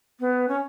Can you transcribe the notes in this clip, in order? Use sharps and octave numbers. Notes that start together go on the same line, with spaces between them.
B3
C#4